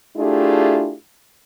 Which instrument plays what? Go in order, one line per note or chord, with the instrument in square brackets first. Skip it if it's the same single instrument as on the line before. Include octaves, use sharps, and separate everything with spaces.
[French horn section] A3 D4 E4 F4 G4 G#4